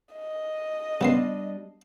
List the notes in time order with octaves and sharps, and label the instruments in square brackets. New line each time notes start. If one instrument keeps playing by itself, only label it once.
[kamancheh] D#5
[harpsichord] C#3 B3 C6 [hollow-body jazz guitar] G3 D4